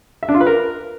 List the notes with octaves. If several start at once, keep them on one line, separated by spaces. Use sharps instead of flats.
E5
D4
F4
B4
A#4